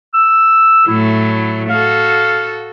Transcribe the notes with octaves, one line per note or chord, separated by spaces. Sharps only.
E6
A2 F#3 A3 E4
F#4 A4 F5